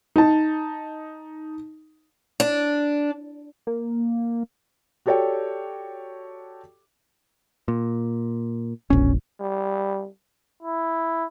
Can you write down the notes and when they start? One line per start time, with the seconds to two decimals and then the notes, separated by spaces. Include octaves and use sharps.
0.16 D#4 A5
2.40 D4
3.67 A#3
5.06 F#4 G4 A4 C#5 D5 G5
7.68 A#2
8.90 E1 A#1 C#4
9.40 G3
10.63 E4